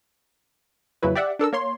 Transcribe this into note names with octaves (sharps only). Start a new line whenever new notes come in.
F2 A#2 C#3 F#3 E4 B4
G4 D5 E5 F#5
D4 A4 A#4 E6
A#3 C#5 C6